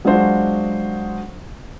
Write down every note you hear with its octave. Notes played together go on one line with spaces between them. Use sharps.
F#3 G#3 D4 F4 F#4 C5